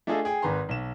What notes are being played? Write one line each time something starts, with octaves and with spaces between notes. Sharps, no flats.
A3 D4 F4 G#4 A4 D#5
G#4 G5
G#1 D#3 B4 A#5 C6
B1 E7